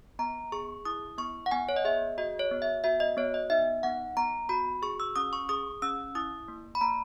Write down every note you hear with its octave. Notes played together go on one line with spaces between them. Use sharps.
B3 A#5
G#4 C#6
E4 D#6
B3 C#6
F#5
B3 G#5
C#5
D#5
G#4 E5
F#4 D#5
C#5
B3
E5
F#4 E5
D#5
B3 C#5
D#5
D#4 E5
B3 F#5
B3 A#5
F#4 B5
G#4 C#6
E6
C#4 D#6
C#6
G#4 D#6
C#4 E6
E4 D#6
A#3
B5
A#3 A#5